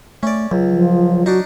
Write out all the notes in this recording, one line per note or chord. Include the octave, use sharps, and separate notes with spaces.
A3 C#4 D5
C#2 F#3
F3
D4 D#4 F#4